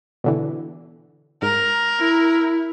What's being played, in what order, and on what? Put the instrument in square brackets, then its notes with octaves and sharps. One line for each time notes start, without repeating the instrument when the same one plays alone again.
[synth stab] B2 D3 E3
[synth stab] G#2 [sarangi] A#4
[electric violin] E4